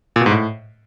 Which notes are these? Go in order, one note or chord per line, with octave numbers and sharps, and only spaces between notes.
A#2
B2
G#2
A2